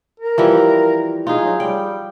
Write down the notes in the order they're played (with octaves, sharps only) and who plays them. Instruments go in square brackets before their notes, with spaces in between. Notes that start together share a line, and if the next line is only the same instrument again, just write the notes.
[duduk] A#4
[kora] E3 F3 G3
[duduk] D#4 [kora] F4 G#4
[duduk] F#3
[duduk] G3 [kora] G5